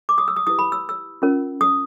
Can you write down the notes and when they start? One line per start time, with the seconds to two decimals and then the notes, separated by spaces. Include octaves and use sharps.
0.09 D6
0.18 D#6
0.28 E6
0.36 D#6
0.47 E4 G4 B4 D#6
0.59 B5
0.72 E6
0.89 E6
1.22 C#4 F4 A#4
1.61 D#6